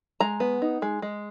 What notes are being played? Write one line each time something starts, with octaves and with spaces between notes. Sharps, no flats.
G#3 A#5
B3
D#4
G#3
G#3